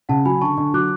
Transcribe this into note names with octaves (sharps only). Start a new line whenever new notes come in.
C#3 F#5 A5
F#3 G#5 B5
D3 A5 C#6
D3
F#3 D6 F#6